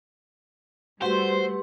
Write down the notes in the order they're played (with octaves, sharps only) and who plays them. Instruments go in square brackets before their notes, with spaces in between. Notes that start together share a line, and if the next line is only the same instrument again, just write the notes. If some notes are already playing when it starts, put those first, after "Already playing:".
[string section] G3 A3 F#5 [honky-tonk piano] F#4 [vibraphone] G4 B4 C6 [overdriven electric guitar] C5